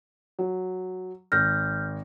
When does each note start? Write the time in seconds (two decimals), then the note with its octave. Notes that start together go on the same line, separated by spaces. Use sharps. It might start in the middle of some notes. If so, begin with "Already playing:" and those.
0.39 F#3
1.32 G#1 F6 G6 A#6